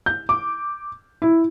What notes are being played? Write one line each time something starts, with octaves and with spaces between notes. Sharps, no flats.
G6
D6
E4